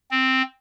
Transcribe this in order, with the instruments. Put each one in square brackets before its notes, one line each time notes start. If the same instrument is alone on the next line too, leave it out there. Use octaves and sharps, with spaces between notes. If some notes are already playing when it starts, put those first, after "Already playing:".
[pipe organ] C4